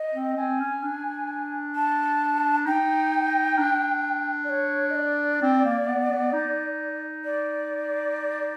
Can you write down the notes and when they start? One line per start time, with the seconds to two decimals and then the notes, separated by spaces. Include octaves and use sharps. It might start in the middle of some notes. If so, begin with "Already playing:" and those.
Already playing: D#5
0.14 C4
0.37 C4 G#5
0.60 C#4
0.83 D4
1.75 A5
2.66 D#4 G5
3.58 D4
4.44 D5
4.49 C#5
4.90 D#5
4.95 D5
5.42 C4
5.65 A#3
5.88 B3
6.11 B3
6.33 D#4
7.25 D5